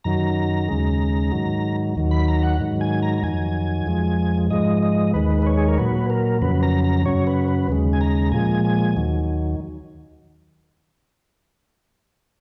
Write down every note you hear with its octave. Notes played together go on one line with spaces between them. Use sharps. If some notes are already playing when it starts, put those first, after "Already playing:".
F#2 D#3 F#3 A#5
D#2 C#3 G#3
G#2 D#3 F#3
D#2 D#3 F#3
B5
A#5
F#5
G#2 D#3 F#3
G#5
A#5
A#5
F2 D#3 F#3 G#5
F2 F3 G#3
G#2 F3 G#3 D#5
D#5
D#2 D#3 G#3 B4
B4
C#5
G#4
A#4
A#2 F#3 B4
A#4
F2 C#3 F#3 B4
A#5
A#5
F#2 C#3 F#3 C#5
B4
B4
D#2 C#3 G#3
G#5
A#5
A#2 F3 G#3 G#5
G#5
D#2 D#3 F#3